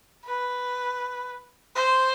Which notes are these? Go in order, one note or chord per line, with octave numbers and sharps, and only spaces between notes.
B4
C5